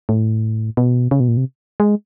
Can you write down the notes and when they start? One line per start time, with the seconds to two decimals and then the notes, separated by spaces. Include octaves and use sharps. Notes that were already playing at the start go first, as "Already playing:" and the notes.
0.09 A2
0.77 B2
1.11 C#3
1.20 B2
1.28 A#2
1.37 C3
1.80 G#3